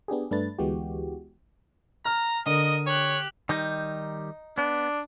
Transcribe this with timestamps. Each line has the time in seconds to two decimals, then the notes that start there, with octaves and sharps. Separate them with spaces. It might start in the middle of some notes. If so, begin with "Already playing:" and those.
0.08 B3 D4 G4 G#4
0.31 G2 A3 D4 B4 A6
0.58 D2 E3 G#3 B3 F#4 G4
2.05 A#5 F6
2.46 D3 A#4 D#5 D#6
2.87 G4 C#5 F#6
3.49 D#3 G3 D#4 G4
4.58 B3 D4